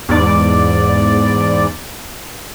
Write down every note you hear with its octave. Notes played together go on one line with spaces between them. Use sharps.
E2 G#2 D5